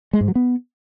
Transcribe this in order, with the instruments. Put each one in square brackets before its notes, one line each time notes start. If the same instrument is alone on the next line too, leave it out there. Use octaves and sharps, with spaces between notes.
[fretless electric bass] G#3
G#2
F#3
B3